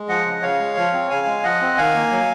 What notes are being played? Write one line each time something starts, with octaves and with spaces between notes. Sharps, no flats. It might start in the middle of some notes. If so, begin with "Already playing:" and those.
Already playing: G#3
F3 D#5 F#5
C#3
C#3 C#5 F5
G#3
F3
C4
C#3 F5 G#5
G#3
F3 D#5 F#5
C4
D#3 F5 G#5
A#3
F#3